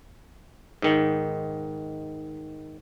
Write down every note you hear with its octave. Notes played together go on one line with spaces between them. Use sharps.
G#2 D#3